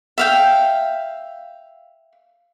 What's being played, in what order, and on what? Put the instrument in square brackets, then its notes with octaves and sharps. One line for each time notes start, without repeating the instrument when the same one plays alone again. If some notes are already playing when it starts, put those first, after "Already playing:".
[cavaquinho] E5 F5 G5